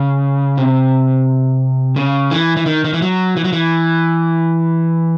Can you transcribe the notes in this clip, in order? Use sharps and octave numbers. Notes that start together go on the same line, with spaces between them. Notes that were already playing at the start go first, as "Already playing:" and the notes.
Already playing: C#3
C3
C#3
E3
E3
D#3
D#3
E3
F#3
E3
F#3
E3